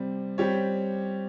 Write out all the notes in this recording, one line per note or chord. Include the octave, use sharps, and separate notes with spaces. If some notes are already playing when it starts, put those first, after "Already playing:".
Already playing: C3 G3 C4
G3 C4 G4 C#5